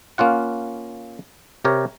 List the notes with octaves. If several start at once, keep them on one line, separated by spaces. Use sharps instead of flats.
A#3 C#4 F4 F#5
C3 G4 A#4 C#5